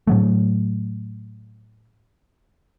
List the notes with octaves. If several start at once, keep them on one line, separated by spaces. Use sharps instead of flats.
A2 F#3 A3